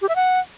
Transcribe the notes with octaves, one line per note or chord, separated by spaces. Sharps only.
G4
E5
F#5